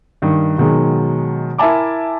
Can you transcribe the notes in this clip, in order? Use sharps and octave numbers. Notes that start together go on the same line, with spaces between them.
G2 D#3
B2 D#3 F#3 G#3
E4 A#4 E5 G#5 A5 D6